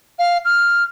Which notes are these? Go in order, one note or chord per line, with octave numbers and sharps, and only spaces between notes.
F5
F6